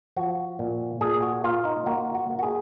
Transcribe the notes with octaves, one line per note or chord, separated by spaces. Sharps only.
F3 F#4
A#2
A#2 G#4
F#4
A#3 F4
D#4
A#3 F#4
F#4
A#3
F#4
G#4